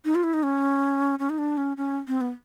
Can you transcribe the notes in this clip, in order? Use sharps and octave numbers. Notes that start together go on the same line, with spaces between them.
D#4
F4
E4
D#4
C#4
C#4
D#4
D4
C#4
C#4
C4
B3